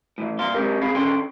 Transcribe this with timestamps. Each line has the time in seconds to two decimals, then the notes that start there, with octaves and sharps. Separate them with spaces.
0.18 A2 D#3 E3
0.39 C2 A#2 A#3 F5 C6
0.55 G#3 C4 G4 A#4
0.82 C4 G#4 F5 B5
0.95 D3 D#3 C#4 G5 C6